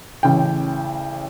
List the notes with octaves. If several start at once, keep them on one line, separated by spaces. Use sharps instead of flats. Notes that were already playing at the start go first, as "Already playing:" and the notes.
A1 C#3 G5